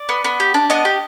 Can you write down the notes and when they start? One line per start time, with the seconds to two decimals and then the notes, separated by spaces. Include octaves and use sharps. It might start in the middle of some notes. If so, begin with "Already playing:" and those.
Already playing: D5
0.09 B3
0.24 B3
0.40 G4
0.54 D4
0.70 B3 D#5
0.85 G4